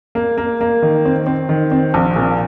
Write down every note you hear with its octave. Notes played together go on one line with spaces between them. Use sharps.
A#3
A#3
A#3
D#3
C4
C4
D#3
C4
A#1
A#2